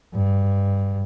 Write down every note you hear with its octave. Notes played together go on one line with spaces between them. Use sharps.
G2